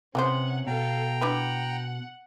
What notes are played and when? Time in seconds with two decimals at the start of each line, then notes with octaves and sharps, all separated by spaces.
0.15 C3 E3 B3 C#4 C5 F#5
0.67 B2 A4 F5 G5 A#5
1.21 D4 E4 B4 F#5